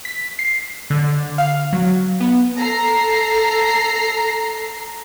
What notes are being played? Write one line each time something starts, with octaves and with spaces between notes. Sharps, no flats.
B6
C7
D3
F5
F#3
B3
A4 A#5 C7